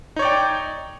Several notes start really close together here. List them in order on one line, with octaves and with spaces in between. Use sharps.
D#4 C#5 D5 G5